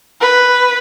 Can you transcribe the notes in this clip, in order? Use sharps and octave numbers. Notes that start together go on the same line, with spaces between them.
B4